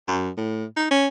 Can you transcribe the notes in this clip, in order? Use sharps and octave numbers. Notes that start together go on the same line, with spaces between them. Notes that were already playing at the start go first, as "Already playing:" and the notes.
F#2
A2
D#4
C#4